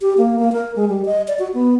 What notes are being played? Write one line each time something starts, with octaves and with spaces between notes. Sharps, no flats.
G4
A#3
A#3
A#4
G#3
G3
D#5
D5
F#4
B3